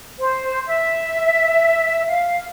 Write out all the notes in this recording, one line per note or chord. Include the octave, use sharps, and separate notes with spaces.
C5
E5
F5